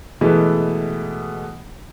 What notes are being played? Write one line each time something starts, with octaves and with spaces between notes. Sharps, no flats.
B2 E3 G#3 A3 B3